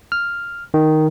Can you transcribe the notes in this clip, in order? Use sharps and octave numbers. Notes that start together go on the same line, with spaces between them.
F6
D#3